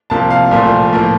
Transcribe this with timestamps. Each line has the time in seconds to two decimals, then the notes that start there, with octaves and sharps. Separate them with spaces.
0.10 C2 C3 F3 A#3 A5
0.31 F5
0.51 C2 A#2 F3 A3
0.93 A2 F3 A#3